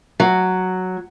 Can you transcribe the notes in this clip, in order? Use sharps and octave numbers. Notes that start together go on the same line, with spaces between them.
F#3